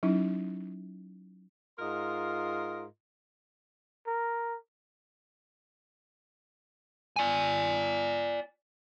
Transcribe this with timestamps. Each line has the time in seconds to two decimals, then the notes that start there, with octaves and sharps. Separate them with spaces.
0.03 F#3 C#4 D#4 E4
1.79 G#2 F4 A#4 D#5 C6
4.07 A#4
7.16 D5 G#5